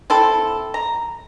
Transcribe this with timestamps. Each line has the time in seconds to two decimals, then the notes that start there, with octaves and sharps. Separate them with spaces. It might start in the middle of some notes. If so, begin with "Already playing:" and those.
0.10 C4 E4 A4
0.74 A#5